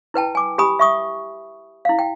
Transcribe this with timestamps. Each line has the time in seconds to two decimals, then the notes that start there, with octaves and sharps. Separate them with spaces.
0.14 E4 B4 G5 A5
0.35 G#5 D6
0.58 G4 G#5 B5 D#6
0.79 E5 C#6 D#6
1.85 E4 F5
1.99 G5